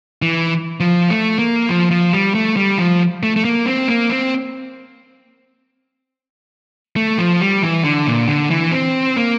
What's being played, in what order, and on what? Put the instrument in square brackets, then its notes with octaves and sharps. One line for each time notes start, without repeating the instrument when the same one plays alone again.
[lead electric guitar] E3
F3
A3
A#3
F3
F3
G3
A3
G3
F3
A3
A3
A#3
C4
A#3
C4
A3
F3
G3
E3
D3
A#2
D3
E3
C4
A#3